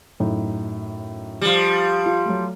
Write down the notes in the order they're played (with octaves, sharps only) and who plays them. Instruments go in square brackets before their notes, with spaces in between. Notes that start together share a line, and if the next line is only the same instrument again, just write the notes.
[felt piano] F#2 A2 D#4
[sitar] F3 G3
[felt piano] F4
F#3 A3